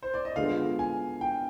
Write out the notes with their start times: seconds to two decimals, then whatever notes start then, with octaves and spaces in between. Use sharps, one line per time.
0.03 C5
0.14 D5
0.25 D#5
0.36 D3 G#3 B3 F4 G#4 F5
0.79 G#5
1.21 G5